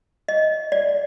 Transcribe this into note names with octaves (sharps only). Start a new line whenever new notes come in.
D#5
D5